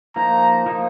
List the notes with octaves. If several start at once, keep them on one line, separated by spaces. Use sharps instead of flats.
F3 A#3 D#4 A#5
F3 A#3 D#4